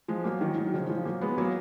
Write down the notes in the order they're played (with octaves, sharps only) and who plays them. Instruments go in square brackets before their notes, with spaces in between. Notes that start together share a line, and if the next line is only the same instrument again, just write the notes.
[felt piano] F3 G#3
F#3 A#3
D#3 F#3
D#3 F#3
C#3 F3
F3 G#3
F#3 A#3
G#3 B3
F#3 A#3